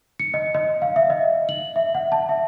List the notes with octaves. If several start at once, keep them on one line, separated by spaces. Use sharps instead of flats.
C#7
D#5
D#5
F5
E5
D#5
F#7
E5
F#5
A5
E5